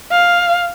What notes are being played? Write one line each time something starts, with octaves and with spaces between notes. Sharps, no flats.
F5